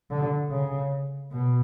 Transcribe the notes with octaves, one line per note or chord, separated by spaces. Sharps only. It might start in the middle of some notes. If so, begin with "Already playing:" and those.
D3
C#3
B2